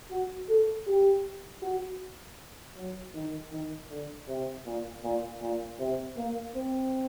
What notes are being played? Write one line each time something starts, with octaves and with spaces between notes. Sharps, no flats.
F#4
A4
G4
F#4
F#3
D#3
D#3
D3
C3
A#2
A#2
A#2
C3
A#3
C4